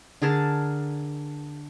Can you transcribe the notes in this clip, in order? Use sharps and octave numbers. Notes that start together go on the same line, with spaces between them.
D3 G#4 A#4 A5